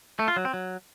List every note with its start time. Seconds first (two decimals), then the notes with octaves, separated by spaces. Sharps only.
0.19 A3
0.28 F4
0.36 F#3
0.45 C4
0.54 F#3